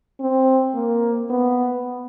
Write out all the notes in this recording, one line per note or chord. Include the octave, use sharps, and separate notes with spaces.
C4
A#3
B3